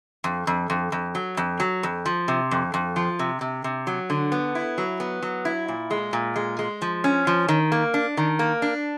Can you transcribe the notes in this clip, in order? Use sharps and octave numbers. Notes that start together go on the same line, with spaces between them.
F2
F2
F2
F2
F#3
F2
F#3
F2
F3
C3
F2
F2
F3
C3
C3
C3
F#3
D3
B3
E4
F#3
B3
F#3
E4
A#2
G#3
A#2
G#3
G#3
F3
C#4
F3
D#3
A#3
D4
D#3
A#3
D4